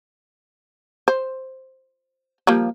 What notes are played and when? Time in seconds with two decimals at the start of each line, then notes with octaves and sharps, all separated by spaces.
1.08 C5
2.47 F3 G3 A#3